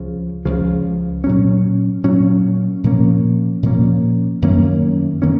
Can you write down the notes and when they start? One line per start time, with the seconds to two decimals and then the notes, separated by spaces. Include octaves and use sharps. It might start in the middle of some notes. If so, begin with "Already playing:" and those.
Already playing: C#2 C#3 F3
0.45 C#2 C#3 F3
1.24 A#2 F#3 C#4
2.04 A#2 F#3 C#4
2.84 A#2 F3 A#3 C#4
3.63 A#2 F3 A#3 C#4
4.42 F#2 D#3 A#3 C#4
5.22 D#3 A#3 C#4